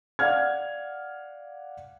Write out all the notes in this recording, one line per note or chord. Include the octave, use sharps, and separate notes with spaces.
D5 F5 F#5 F6 G#6